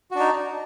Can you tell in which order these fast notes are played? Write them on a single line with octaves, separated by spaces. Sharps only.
F#4 D4 D#4